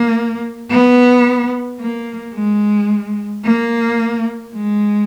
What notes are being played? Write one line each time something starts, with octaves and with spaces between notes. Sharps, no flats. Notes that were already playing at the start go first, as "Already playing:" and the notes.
Already playing: A#3
B3
A#3
G#3
A#3
G#3